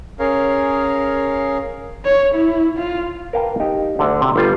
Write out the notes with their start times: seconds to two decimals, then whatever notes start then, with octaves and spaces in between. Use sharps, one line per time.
0.19 C#4 G#4 A#4 C#5 F5
2.05 C#5
2.35 E4
2.78 F4
3.33 A#4 B4 F5 G5 A5
3.60 D#4 G4
3.99 D2 D3
4.21 C3
4.36 G1 G3 F4